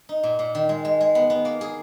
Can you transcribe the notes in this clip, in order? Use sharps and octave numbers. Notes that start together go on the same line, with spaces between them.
D#4
A#2
A#2
D#3
G#3
G#3
G#3
B3
B3
A#3
G#4